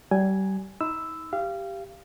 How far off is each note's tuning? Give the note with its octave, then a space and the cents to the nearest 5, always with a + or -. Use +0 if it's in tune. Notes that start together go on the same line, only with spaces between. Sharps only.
G3 -30 G#5 +0
D#4 +35 B5 +40 E6 +0
G4 +0 F5 -25